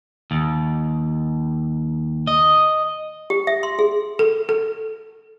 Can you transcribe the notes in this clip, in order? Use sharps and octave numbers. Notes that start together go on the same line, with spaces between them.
D#2
D#5
G4
E5
C6
G#4
A4
A4